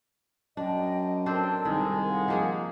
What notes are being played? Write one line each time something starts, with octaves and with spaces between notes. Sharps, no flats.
F#2 D4 D#5 G5
C4 D4 A4 A#4 C5 A5
C2 D#3 G#3
F5 F#5
F3 A#3 G#4